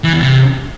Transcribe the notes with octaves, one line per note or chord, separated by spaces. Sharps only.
E3
E2
C3